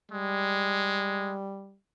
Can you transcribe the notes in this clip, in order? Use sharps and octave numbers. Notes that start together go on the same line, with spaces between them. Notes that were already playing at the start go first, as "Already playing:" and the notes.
G3 G#3